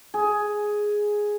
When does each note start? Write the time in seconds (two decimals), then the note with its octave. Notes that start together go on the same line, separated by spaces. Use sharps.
0.14 G#4